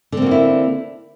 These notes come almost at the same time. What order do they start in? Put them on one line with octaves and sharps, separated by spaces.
D3 C4 A#3 F#4 E4